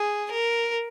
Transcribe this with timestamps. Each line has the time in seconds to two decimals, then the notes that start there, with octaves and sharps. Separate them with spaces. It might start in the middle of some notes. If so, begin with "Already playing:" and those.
Already playing: G#4
0.31 A#4